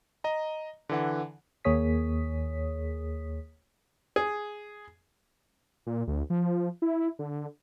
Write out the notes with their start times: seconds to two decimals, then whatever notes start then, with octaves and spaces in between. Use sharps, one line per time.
0.24 D#5 A#5
0.89 D3 E3 F#5
1.65 D#2 A#3 G#4 C#5 D#6 B6
4.16 G#4
5.87 A#2
6.08 D2
6.30 F3
6.82 E4
7.19 D3